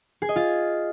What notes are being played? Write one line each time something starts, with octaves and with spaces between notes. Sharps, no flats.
G#4
D#5
F4